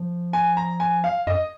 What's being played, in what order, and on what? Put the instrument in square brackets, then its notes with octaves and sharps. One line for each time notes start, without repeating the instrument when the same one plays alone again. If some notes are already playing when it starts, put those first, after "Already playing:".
Already playing: [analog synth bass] F3
[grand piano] G#5
A#5
G#5
F5
[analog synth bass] F#2 [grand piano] D#5